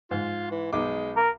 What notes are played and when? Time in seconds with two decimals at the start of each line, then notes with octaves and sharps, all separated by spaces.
0.11 G#2 F4
0.51 E3
0.73 B1 G#3 D#4 D6
1.16 A#4